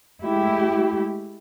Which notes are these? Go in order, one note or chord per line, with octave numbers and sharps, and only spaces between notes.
G#3 A3 E4 G4